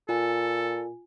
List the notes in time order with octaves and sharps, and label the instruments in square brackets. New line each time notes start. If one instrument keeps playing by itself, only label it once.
[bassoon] A#2 [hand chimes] F4 G#5 [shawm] A4